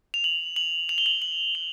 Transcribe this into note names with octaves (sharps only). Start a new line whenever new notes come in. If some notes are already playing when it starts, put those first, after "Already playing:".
F7
F#7
F#7
F7
G7
F#7
F#7
F7